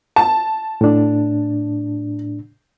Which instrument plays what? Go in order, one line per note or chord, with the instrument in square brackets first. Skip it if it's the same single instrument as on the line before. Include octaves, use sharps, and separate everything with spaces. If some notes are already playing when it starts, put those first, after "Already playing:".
[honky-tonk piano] A5
[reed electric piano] A2 D4